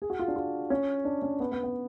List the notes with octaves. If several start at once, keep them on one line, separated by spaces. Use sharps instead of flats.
G#4
F#4
F4
D4
F4
C#4
D4
C#4
B3
B3
B3